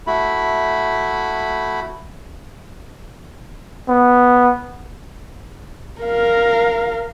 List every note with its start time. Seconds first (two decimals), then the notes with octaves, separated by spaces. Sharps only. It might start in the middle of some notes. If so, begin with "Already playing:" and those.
0.07 A3 E4 F#4 B5
3.89 B3
6.02 A#4 F5